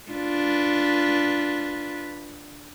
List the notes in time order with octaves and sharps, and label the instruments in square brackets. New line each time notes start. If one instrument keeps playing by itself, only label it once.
[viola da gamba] D4 F4 B4